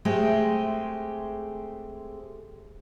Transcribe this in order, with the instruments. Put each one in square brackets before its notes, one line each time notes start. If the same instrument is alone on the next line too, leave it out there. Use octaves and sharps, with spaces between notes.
[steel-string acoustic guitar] G#3 A3 C4 G4